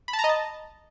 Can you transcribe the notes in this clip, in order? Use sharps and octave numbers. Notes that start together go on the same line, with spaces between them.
B5
A5
A#5
D#5
A5